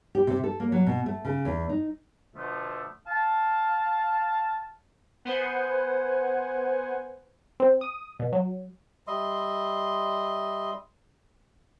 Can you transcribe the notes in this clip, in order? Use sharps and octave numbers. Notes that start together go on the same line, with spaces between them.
G4
C3
A4
A#3
F#3
B2
A3
C#3
E2
D#4
B2 D3 F3 A3
F5 A5
B3 C5 F#5 G#5
C4
D#6
B2
F#3
G3 D#5 E5 C6